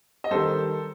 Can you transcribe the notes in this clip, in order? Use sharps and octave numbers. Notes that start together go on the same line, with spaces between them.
D#5
D#3 G3 A4 C5